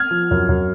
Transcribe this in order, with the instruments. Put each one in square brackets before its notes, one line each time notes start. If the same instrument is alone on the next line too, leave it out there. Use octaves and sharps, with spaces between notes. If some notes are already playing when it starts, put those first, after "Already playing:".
Already playing: [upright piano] F6 G#6
[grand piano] F3
F#2
F#2